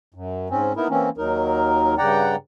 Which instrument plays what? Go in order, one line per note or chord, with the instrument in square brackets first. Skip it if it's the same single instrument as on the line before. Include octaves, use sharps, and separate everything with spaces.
[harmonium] F#2
G#2 C4 C#4
A#3 B3 D#4 E4 A#4
E3 A#3 C4 C#4
D#2 F#3 D#4 A#4
G2 C#3 D5 F#5 G5 A#5